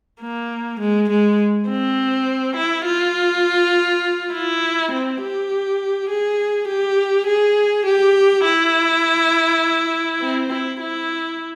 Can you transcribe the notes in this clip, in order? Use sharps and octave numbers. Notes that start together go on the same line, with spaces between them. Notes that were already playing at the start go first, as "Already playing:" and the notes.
A#3
G#3
G#3
C4
E4
F4
E4
C4
G4
G#4
G4
G#4
G4
E4
C4
E4
E4